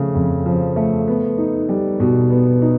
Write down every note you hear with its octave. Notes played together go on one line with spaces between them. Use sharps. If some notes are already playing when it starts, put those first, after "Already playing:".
Already playing: C#3 F3 A3
F2
F3
A3
B3
D#4
G3
B2
B3
D#4